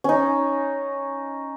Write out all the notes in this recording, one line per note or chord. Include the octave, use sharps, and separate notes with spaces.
C#4 D#4